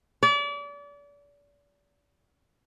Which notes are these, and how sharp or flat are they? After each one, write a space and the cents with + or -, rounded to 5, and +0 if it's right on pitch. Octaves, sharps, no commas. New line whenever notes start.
D5 -35